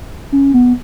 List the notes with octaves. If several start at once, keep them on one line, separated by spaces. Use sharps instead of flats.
C#4
B3